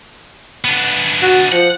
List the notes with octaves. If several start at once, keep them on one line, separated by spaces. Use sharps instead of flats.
B3 D4
F#4
F3 F#5